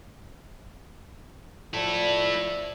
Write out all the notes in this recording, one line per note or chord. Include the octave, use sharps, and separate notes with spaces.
F3 E4 A4 D5